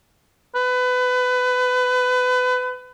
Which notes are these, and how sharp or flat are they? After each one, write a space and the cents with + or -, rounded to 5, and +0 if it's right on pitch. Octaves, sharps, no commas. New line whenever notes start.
B4 +25